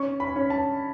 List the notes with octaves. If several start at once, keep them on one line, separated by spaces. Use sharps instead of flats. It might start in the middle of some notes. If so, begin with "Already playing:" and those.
Already playing: C#4 C#6
B5
C#4
A5